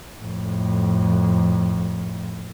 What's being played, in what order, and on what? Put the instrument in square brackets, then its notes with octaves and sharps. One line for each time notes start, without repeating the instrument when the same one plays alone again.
[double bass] F2 A2